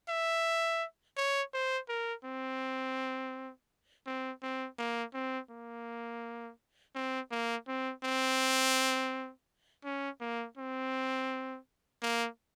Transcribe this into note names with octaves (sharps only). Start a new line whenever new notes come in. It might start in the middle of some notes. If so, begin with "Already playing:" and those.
E5
C#5
C5
A#4
C4
C4
C4
A#3
C4
A#3
C4
A#3
C4
C4
C#4
A#3
C4
A#3